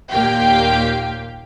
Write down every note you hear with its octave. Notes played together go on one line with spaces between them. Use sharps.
D#2 A#2 A#3 G4 F5 G5